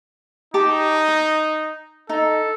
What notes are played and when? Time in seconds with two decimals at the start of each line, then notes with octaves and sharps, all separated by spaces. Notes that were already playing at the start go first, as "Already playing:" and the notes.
0.54 D#4 G4 A5 D6
1.08 D#6
2.09 D#4 A4